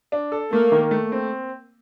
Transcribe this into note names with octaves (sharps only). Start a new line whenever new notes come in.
D4
A4
A3 A#3
D#3
A3
C4